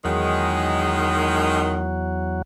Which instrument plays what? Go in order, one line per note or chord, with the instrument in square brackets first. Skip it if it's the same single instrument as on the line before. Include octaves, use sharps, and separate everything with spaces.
[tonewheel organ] E2 F#3 [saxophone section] D#3 G#3